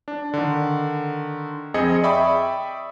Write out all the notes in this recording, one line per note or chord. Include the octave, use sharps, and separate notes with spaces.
D4
D3 D#3
F2 C4 G#4 D#5 C#7
D5 E5 G5 B5 C#6 D#6